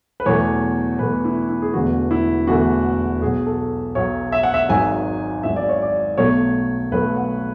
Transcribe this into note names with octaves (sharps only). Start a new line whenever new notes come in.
B4
E2 B2 F#3 A3 C#5
E2 B2 F#3 A3 B4
E4
E4
G#4
E1 E2 D3 A3 F#4
E4
E1 E2 D3 A3 F#4
B1 B2 F#3 G#4
A4
B1 B2 F#3 C#5
E5
F#5
E5
G#1 G#2 F#3 G#5
G#1 G#2 F#3 E5
D5
C#5
D5
B1 B2 F#3 A3 C#5
B1 B2 F#3 A3 B4
F#5